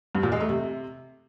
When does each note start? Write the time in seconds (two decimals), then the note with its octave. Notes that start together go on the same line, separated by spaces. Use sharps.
0.15 G2
0.23 A#2
0.32 G#3
0.40 A3
0.49 C3